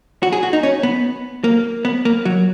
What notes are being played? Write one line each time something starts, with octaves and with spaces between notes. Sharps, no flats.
F#4
G#4
F#4
D#4
C#4
B3
A#3
B3
A#3
F#3